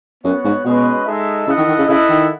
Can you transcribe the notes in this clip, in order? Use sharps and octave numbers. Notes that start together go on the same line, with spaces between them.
F#2 B3 F#4 C#5 F#5
G#2
B2 G#3 C#4 F#4 B4 D#5
G#3 D#4 A4 E5
C#3 E4 A4 D#5 F#5
D#3
D#3
C#3
C#3 E4 A4 D#5 F#5
D#3